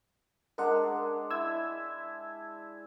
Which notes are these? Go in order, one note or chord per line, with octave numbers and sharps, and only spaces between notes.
G#3 D4 A#4 F#5 C6
E4 E6 G#6